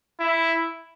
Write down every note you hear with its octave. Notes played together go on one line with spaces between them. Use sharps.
E4